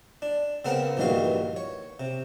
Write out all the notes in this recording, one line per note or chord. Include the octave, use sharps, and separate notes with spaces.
D4
C#3 B3 C4 A#4 F#5
A#1 G2 D#3 E3 F#4 F5
C#5
C3